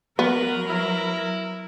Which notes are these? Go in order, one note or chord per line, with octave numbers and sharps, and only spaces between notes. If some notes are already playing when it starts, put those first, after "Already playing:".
F#3 B3 A#4 B4
E4